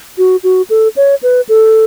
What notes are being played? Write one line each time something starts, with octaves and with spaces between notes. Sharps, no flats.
F#4
F#4
A4
C#5
B4
A4